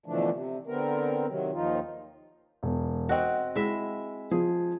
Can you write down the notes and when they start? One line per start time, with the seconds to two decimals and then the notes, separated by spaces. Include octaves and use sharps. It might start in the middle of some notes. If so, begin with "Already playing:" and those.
0.06 B2 D3 E3 F3 A3 D4
0.31 C3
0.67 D3 B3 C4 A#4
1.27 C3 D#3 F#3
1.52 D#2 D#3 F3 D#4 F4
2.63 E1
3.09 C4 F#4 D#5 F#5
3.56 G#3 E4 E5
4.31 F3 G#4